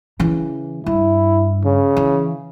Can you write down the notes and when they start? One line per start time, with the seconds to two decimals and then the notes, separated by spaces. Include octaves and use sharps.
0.20 C#3 E3
0.86 G2 E4
1.64 C#3
1.97 E3